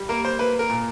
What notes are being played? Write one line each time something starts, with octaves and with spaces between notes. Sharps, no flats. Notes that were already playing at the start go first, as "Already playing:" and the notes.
Already playing: G3
A#3 A#4
C5
A#3 B4
A#4
A#2